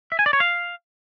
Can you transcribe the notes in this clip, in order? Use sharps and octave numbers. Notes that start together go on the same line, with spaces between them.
E5
G#5
D5
C#5
F5